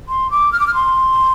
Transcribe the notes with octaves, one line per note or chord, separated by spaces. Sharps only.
C6
D6
F6
D6
F6
C6